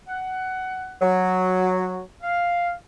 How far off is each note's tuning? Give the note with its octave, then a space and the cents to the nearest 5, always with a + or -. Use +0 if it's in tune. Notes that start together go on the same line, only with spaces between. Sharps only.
F#5 +15
F#3 -5
F5 +0